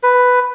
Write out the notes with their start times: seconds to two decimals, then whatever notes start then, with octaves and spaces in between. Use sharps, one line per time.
0.03 B4